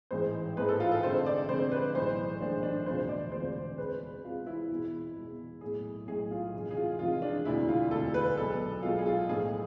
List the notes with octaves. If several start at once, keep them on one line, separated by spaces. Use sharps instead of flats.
A1 G#2 E3 G#3 C5
A1 G#2 E3 G#3 B4
A4
F4
A4
F1 F2 D3 G#3 C5
D5
F1 F2 D3 G#3 C5
B4
B1 A2 E3 G#3 C5
B1 A2 E3 G#3 D4
D4
E1 D2 C3 F3 G#3 C5
D5
E1 D2 C3 F3 G#3 C5
E2 C3 G#3 B4
E2 C3 G#3 F4
E4
E2 B2 G#3
E2 B2 G#3
B1 A2 G#3 G#4
B1 A2 G#3 G#4
F4
F1 F2 C3 E3 G#3
G#4
F4
F1 F2 C3 E3 G#3 F4
D4
E1 D2 C3 E4
F4
E1 D2 C3 A4
B4
B1 B2 G#3 A4
B1 B2 G#3 F4
G#4
F4
B1 A2 F3 G#3 G#4